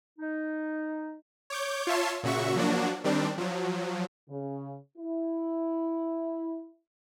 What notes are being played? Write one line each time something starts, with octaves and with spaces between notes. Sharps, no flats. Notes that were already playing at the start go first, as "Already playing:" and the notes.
D#4
C#5 D6 G6
F4 C#5 E5 A5 C6
A#2 C#3 F#4 E5 C#6
F3 F#3 A#3 D4 F#4
D#3 G3 C4 D4
F3 F#3
C#3
E4